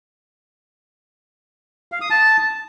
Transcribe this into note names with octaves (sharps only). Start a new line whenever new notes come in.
F5
D#6
A5